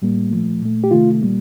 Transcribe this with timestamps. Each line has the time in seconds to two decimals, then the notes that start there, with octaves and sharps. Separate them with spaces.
0.02 A2 G3 A#3
0.31 A#2 F3 A3
0.62 A#2 A3
0.84 G4
0.91 C3 D#3 A3 F4
1.21 A#2 G3 A#3